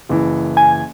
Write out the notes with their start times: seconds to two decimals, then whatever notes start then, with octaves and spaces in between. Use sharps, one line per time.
0.09 F#1 E3
0.57 G#5